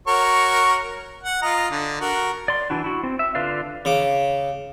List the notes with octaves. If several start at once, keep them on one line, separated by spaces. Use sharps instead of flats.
F#4 A#4 C#5
F#5
F4 D#5 A#5
D3
F#4 A#4
D5 C6
E3 D4 E4 F#4
E4 F#4
C4
E5
D3 F4 B4 D5 F5
C#3 D6